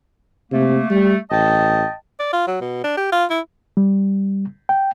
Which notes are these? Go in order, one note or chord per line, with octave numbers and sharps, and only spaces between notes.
C3 A3 A#3
G3 A3
A1 D#5 G5 A5
D5
F4
F#3
B2
D4
G4
F4
E4
G3
G5